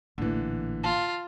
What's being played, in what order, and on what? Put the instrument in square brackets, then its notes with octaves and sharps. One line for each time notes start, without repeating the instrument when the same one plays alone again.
[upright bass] A1 A#2 [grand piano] D3 E3
[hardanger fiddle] F4 [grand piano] A5